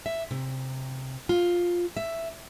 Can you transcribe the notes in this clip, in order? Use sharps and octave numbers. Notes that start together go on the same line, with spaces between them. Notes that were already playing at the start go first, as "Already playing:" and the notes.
E5
C3
F4
E5